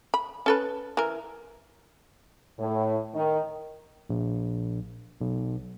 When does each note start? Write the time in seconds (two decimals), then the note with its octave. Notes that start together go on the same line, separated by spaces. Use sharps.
0.14 B5
0.46 C#4 A4 B4
0.97 E3 A#4
2.60 A2
3.15 D#3
4.10 A#1
5.21 B1